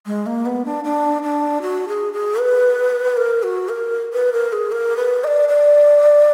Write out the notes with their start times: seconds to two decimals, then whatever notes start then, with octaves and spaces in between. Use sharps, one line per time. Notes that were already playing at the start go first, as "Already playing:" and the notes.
0.06 G#3
0.26 A#3
0.46 B3
0.65 D4
0.84 D4
1.23 D4
1.62 F#4
1.88 G#4
2.13 G#4
2.39 B4
3.17 A#4
3.43 F#4
3.69 A#4
4.13 B4
4.33 A#4
4.53 G#4
4.72 A#4
4.97 B4
5.24 D#5
5.27 D5
5.49 D5